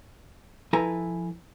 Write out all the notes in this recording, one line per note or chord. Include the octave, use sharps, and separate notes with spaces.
F3 E4 A4 B4 G#5 A#5